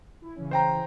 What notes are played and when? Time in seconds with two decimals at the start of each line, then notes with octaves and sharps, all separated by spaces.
0.22 E4
0.35 C#3 E3 C#4
0.51 C5 G5 A#5